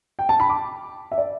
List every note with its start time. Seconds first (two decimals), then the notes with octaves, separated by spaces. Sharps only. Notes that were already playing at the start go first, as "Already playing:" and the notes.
0.19 G5
0.29 A5
0.40 B5
0.49 D6
1.12 E5
1.18 D5